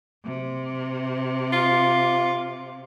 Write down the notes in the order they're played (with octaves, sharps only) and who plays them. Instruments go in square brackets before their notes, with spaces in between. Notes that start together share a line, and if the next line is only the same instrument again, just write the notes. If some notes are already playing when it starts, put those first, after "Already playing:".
[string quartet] C3
[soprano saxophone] F4